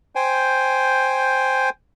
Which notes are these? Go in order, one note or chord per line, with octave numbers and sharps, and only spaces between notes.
C5 G5 G#5